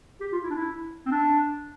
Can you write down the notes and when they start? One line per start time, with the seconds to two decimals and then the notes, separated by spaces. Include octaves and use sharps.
0.21 G4
0.32 F4
0.44 E4
0.50 D4
0.55 E4
1.06 C4
1.11 D4